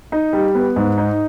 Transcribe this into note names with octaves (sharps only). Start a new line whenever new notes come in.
D#4
G3
B3
G#2
D#4